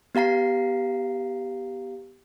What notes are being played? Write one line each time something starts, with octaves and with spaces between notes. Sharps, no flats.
B3 G4 F5 A#5 C7